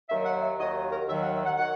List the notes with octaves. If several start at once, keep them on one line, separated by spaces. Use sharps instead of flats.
D#2 D#3 F#3 E5
F#5
E5
D#2 D#3 F#3 D#5
A#4
D#2 D#3 F#3 E5
F#5
E5
F#5
D#3 F#3 F#5